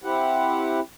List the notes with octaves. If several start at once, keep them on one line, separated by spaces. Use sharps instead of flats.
C4 E4 G4 F#5